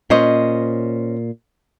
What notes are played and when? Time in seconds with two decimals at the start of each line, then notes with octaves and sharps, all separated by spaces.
0.10 A#2 C#4 C5 D#5